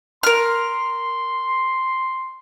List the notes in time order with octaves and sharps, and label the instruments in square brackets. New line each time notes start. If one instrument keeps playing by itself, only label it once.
[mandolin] A#4 F6 [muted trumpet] C6